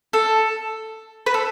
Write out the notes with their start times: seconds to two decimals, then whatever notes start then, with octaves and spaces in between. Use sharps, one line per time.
0.13 A4
1.26 B4
1.34 A4